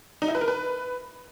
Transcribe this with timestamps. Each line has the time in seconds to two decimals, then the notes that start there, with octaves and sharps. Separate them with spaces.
0.22 D#4
0.28 E4
0.35 B4
0.41 A#4
0.48 B4